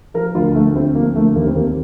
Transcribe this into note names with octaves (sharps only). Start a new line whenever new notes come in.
F3 A#4
D2 F4
D3 A3
D2 C4
F3 A#3
D2 A3
D#2 A#3
C4
D#2 A#3